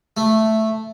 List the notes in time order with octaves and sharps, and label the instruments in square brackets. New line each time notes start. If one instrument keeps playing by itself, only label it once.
[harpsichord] A3